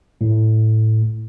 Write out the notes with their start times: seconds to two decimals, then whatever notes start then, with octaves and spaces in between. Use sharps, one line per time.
0.21 A2